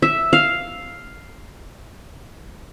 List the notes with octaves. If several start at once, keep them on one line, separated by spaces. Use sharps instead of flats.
E5
F5